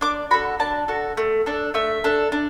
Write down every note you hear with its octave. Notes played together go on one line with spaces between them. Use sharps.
D4 D6
F#4 A4 B5
D4 A5
F#4 A4
A3
D4 A4
A3 E5
D4 A4
D4